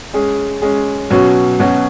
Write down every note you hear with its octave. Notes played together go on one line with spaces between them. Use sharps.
G#3 C#4 G#4
G#3 C#4 G#4
B2 F#3 C#4 F#4
B2 F#3 C#4 F#4